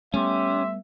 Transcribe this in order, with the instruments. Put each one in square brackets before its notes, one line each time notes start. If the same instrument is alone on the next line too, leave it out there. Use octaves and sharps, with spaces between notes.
[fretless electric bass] G3 A3 B3 [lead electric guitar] C#4 [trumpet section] G4 C6 [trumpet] E5